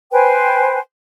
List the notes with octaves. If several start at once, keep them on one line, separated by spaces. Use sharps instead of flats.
B4 C5 G5 G#5